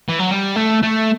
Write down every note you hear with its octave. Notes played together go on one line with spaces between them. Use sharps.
E3
F#3
G3
A3
A3